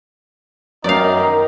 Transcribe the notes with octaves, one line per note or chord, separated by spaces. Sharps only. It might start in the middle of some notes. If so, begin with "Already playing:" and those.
F#2 D#3 D#4 D5 F5